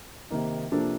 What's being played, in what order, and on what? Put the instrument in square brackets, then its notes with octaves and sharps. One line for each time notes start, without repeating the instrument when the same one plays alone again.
[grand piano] C3 D#3 A#3 D#4
C3 F3 A#3 D4 A4